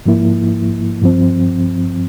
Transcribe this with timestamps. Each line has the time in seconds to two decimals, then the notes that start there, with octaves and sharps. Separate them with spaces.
0.06 G#2 F3 A#3 E4
1.02 G2 F3 C4